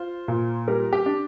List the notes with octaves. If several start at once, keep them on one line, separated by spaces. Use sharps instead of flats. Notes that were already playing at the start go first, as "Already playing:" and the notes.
Already playing: F4 C5
A#2
G3 A#4
G4
D4